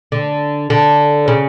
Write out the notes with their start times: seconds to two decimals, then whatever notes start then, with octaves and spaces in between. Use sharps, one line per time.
0.12 D3
0.70 D3
1.28 C#3